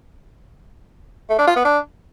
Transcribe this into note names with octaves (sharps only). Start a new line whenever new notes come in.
A3
D4
F4
B3
D4